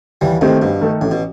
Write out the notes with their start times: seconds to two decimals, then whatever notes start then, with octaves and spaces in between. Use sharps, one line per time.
0.21 D#2 E3 G3
0.41 A2 C3 D#3 A3 C4 D#4
0.61 G2 B2
0.81 D#3 A3 D#4 A4
1.01 A1 A2
1.11 B2